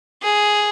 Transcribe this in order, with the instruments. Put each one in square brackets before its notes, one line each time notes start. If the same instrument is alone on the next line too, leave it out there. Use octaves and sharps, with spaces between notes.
[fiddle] G#4